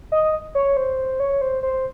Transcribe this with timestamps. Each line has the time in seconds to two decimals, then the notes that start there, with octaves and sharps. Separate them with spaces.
0.12 D#5
0.55 C#5
0.77 C5
1.20 C#5
1.41 C5
1.63 C5